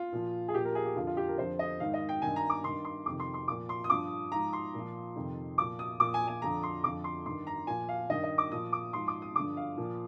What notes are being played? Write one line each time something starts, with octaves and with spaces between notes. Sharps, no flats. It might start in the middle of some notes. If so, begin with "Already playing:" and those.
Already playing: F4
A#2 F3
G#4
A#2 F3 G4
A#4
G#4
G4
F2 D3 F3 F4
F4
G4
A#4
F2 D3 F3 C5
D#5
G#2 D#3 F5
D#5
G5
G2 D#3 G#5
A#5
D6
G2 D#3 C6
C6
F2 C3 D#3 D6
C6
C6
A#2 F3 D6
C6
D#6
G2 F3 D6
G#2 F3 A#5
C6
A#2 F3
F2 C3 D#3
A#2 F3 D6
D#6
A#2 F3 D6
G#5
G#5
F2 D3 F3 A#5
C6
F2 D3 F3 D6
C6
G2 D#3 C6
A#5
A#2 F3 G#5
F5
G2 D#3 D#5
D#5
D6
A#2 F3 D#6
D6
G#2 F3 C6
D6
D#6
G2 D3 F3 D6
F5
A#2 F3